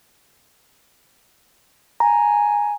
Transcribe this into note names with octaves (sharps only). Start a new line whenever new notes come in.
G#5 A#5